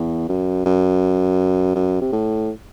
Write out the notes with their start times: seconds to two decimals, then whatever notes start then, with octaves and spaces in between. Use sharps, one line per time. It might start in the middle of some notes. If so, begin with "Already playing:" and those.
Already playing: E2
0.29 F#2
0.66 F#2
1.75 F#2
2.01 C3
2.12 A2